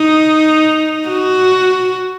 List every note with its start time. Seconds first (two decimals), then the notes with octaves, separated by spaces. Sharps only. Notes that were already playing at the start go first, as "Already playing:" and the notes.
Already playing: D#4
1.08 F#4